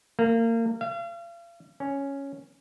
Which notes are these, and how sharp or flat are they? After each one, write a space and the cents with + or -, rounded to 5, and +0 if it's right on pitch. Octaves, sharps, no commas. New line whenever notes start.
A#3 -30
F5 -40
C#4 +0